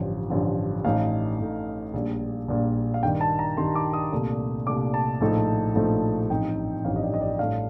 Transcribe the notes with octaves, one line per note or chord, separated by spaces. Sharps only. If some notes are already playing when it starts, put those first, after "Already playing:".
Already playing: A1 G2 D3 F3
A1 G2 D3 F3
A1 A2 A3 D#4 F5
A1 A2 A3 D#4
A#1 A#2 G3
A#1 A#2 G3
F5
G2 D#3 G3 G5
A5
A#5
G2 D#3 G3 C6
D6
D#6
C2 A#2 A3 D4
C2 A#2 A3 D4 D6
A5
A#1 A2 F3 A3 D#4
A#1 A2 F3 A3 D#4
A1 G2 F3 C4 D#4 G5
A1 G2 F3 C4 D#4 F5
D#5
D5
D#5
D5
A2 G3 D4 F5